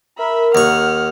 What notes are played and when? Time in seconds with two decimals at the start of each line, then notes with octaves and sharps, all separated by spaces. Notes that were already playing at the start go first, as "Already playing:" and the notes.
0.19 A#4 E5 B5
0.55 D#2 F#5 C#6 F6